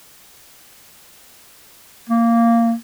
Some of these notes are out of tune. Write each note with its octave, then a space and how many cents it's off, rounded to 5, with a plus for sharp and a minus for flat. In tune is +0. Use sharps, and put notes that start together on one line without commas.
A#3 -10